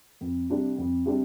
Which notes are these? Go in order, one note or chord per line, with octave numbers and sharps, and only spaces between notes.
F2
C3 G3 D4
F2
C3 G3 D4